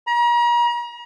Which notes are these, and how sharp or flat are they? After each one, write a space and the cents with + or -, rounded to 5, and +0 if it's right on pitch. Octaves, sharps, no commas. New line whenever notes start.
A#5 +40